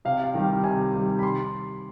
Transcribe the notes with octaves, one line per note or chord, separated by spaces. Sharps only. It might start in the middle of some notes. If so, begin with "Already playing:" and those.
C3 F5
F5
D#3 G3 G5
C3 G#5
D#3 G3
B5
C6